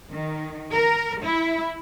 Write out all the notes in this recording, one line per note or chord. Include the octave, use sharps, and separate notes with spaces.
D#3
A#4
E4